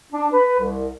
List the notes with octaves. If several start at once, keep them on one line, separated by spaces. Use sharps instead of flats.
D4
B4
C2